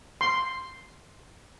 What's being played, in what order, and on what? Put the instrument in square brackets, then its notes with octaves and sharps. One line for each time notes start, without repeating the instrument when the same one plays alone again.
[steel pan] C6